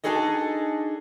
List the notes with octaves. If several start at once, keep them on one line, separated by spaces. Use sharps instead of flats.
D4 D#4 F#4 G#4 A4 D#5